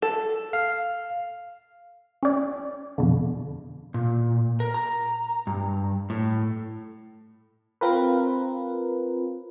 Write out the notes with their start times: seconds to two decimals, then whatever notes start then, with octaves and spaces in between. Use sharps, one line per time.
0.02 A4
0.53 F5
2.23 C#4 D5
2.98 F2 B2 D3
3.94 A#2
4.60 A#4
4.74 A#5
5.47 G2
6.10 A2
7.81 C4 F4 A#4 B4